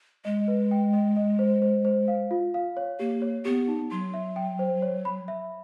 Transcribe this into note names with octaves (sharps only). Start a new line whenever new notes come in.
G#3 D#5
B4
G5
D#5
D#5
C5
C5
C5
F5
F4
F5
C#5
A#3 G4
C#5
B3 G4
D#4
F#3 C6
E5
G5
C5
C#5
B5
E5